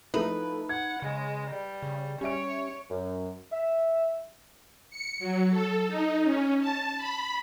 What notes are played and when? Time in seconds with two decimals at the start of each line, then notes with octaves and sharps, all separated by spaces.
0.14 F3 A3 D#4 E4 B4
0.69 F#5 G#6
1.02 C#3 G#3
1.49 G3
1.82 C#3
2.21 G3 C#4 C#5 E5 D7
2.91 F#2
3.52 E5
4.90 C#7
5.19 F#3
5.50 A4
5.88 D#4
6.24 C#4
6.60 A5
6.97 B5